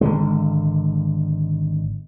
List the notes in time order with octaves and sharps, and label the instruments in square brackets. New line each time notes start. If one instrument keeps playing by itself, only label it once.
[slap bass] G#1 D3 G#3